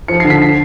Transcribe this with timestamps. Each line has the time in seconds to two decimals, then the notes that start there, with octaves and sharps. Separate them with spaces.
0.08 F3 C#7
0.20 D3 C7
0.30 B6
0.42 C7